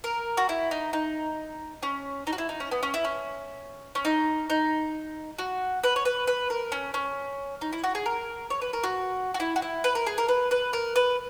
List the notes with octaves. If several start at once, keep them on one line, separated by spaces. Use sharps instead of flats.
A#4
F#4
E4
D#4
D#4
C#4
D#4
F#4
E4
D#4
C#4
B3
C#4
E4
C#4
C#4
D#4
D#4
F#4
B4
C#5
B4
B4
A#4
C#4
C#4
D#4
E4
F#4
G#4
A#4
C#5
B4
A#4
F#4
F#4
E4
F#4
E4
B4
A#4
G#4
A#4
B4
B4
A#4
B4